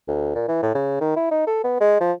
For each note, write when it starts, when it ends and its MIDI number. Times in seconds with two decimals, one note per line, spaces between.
0.08 0.33 38
0.35 0.46 46
0.48 0.62 52
0.63 0.71 45
0.75 0.99 49
1.01 1.16 51
1.16 1.30 64
1.31 1.45 63
1.47 1.60 69
1.64 1.77 59
1.80 1.98 56
2.00 2.12 53